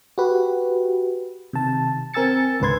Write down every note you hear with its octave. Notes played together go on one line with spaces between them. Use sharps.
F#4 G4 B4
C3 D#3 A5
C4 A#4 G#5 E6 A6 C#7
C#2 G#2 D3 B4 C6 G#6